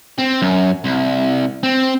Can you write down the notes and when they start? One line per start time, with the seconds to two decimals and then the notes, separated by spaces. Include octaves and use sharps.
0.18 C4
0.42 F#2
0.84 C2
1.63 C4